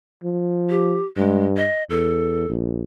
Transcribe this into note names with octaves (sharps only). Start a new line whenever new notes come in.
F3
G4
G2 G#3
D#5
E2 A4
A#1